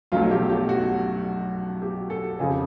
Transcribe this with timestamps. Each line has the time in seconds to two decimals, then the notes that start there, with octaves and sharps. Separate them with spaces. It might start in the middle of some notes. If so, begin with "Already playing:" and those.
0.12 B1 B2 F#3 A3 F4
0.31 G4
0.50 G4
0.69 F#4
1.82 G4
2.10 A4
2.39 F2 C#3 F3 G#4
2.50 G4